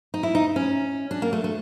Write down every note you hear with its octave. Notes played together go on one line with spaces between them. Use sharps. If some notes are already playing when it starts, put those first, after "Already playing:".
D#4
E4
D#4
C#4
D4
A#3
A3
A3